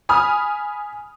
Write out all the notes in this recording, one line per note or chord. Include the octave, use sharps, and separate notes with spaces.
G#5 B5 D#6 F6